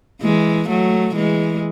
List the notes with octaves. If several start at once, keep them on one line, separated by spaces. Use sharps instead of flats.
E3 G#3
F#3 A3
E3 G#3